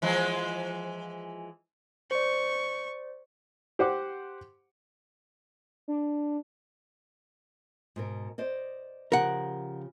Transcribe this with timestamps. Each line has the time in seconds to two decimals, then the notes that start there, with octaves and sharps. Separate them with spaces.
0.02 E3 F3 G#3
2.11 C5 D5 C#6
3.79 G4 C5 F#5 D6
5.88 D4
7.96 G#2 B2 A#4
8.38 C5 D5 D#5
9.12 C#3 F3 G4 A#4 F#5